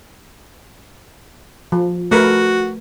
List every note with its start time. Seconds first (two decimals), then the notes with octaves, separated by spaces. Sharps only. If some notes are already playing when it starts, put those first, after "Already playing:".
1.72 F3
2.11 A3 F#4 A#4 B4